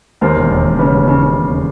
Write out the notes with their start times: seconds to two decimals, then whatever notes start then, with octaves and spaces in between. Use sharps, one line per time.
0.21 D#2 A#4 C5
0.36 E1
0.51 E1
0.65 E1
0.79 C#3 B4 C#5
0.94 D#2
1.08 C#3
1.23 C#3
1.36 E1
1.51 C#3